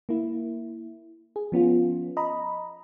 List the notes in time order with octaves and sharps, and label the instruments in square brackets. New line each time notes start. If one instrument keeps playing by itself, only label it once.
[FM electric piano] A#3 E4
G#4
F3 B3 C#4 F4
D#5 A#5 B5